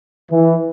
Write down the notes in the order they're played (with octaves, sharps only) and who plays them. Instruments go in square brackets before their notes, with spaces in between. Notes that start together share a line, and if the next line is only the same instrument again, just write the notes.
[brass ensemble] E3